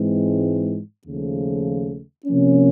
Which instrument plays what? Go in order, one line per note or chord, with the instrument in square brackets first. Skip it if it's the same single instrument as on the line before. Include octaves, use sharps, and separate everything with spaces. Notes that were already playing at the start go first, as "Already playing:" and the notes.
Already playing: [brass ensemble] G#2 E3 G#3 C4
D#2 C#3 F3 A3
C3 F3 A#3 C#4